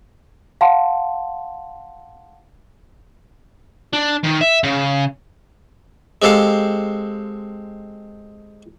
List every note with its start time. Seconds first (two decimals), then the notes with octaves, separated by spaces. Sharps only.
0.61 F5 F#5 A5 C6
3.93 D4
4.24 D#3
4.41 E5
4.63 C#3
6.22 G#3 C4 G4 A4 F5